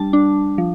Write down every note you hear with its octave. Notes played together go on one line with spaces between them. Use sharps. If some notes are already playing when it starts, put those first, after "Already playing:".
Already playing: G3 D4 A5
D4
F3